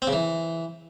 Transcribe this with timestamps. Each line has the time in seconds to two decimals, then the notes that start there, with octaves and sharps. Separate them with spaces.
0.02 C4
0.07 C#3
0.13 E3